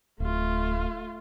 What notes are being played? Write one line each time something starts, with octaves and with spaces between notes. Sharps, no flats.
D1 A3 F4